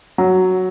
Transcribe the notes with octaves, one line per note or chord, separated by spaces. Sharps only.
F#3